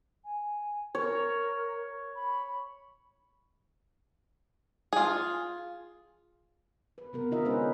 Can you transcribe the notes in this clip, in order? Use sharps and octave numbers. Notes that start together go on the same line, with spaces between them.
G#5
A#4 C#5
B5
F4 G#4
B4
C3 B3 A#4
D3 D#4 F4 A#4 D#5 E5
G#3 C#4 D#4 G#4 B4 C5